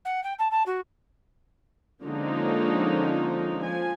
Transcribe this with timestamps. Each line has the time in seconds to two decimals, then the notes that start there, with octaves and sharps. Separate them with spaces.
0.05 F#5
0.24 G5
0.39 A5
0.51 A5
0.66 F#4
2.04 D3 F3 G#3 A#3 C#4 D#4
3.60 F3 G#5